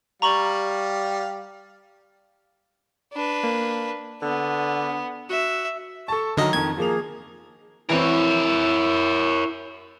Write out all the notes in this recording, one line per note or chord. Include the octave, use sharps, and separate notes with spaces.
G3 F5 A#5 C#6 F#7
D4 B4
A#3
D3 B3
F#4 E5
A4 A5 C#6
D3 D#3 F#3 A#4 D#5 A#5
F2 D#3 G#6
F3 A#3 G#4 F7
E3 C4 E4 A#4 C#5